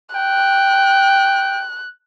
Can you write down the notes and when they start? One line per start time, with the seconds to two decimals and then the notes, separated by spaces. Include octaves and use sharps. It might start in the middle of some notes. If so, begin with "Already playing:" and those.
0.15 G5 F#6